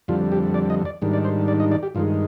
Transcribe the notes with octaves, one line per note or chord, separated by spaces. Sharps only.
F2 D3 G3 F4
G4
D5
D#5
D5
G#2 D#3 G3 D4
D5
C5
D5
D#5
D5
G4
G2 D#3 G#3 F4